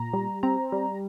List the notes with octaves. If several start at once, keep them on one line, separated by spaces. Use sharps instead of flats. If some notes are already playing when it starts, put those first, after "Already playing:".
Already playing: A#2 A#5
G3
C4 A#5
G3